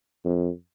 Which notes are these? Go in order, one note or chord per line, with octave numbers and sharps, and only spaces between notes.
F2